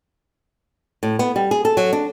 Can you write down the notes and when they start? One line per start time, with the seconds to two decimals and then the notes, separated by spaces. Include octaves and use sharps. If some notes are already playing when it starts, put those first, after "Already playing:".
1.03 A2
1.19 B3
1.36 G3
1.51 G#4
1.65 A4
1.77 F#3
1.93 D4